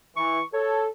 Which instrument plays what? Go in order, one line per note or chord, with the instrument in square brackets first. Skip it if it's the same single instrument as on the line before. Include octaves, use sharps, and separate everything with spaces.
[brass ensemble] E3 [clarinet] C#6
[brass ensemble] A4 [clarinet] C#5